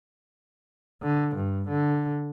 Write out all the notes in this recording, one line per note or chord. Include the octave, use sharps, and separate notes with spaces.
D3
G2
D3